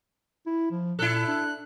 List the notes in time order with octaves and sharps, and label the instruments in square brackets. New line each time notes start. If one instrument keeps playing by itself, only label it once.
[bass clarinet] E4
F3
[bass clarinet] A#2 [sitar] E4 A4 [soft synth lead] F#6
[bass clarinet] D4